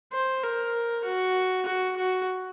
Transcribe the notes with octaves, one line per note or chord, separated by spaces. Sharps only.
C5
A#4
F#4
F#4
F#4